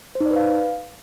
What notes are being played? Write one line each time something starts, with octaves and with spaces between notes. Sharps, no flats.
C5
D#4
D5
B4
F5